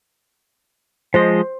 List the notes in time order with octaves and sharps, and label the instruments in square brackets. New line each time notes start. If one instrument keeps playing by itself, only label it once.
[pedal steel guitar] F3 G#3 D#5 [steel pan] C5